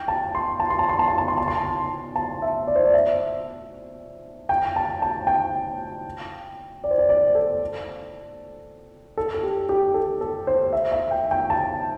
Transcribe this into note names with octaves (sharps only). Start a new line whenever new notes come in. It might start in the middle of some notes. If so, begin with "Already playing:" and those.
Already playing: G5
A5
C6
A5
C6
A5
C6
A5
C6
A5
C6
A5
C6
A5
A5
E5
D5
C5
D5
E5
G5
A5
A5
G5
D5
C5
D5
D5
A4
A4
A4
G4
G4
A4
A4
C5
E5
E5
G5
G5
A5